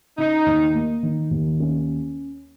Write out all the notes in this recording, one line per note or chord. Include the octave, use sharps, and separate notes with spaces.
C#3 D#4
D#2
A#3
D#3
D#2
C#4